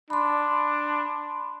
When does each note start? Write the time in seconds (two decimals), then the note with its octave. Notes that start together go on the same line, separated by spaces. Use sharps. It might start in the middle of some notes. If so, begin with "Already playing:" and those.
0.10 D4 B5 C6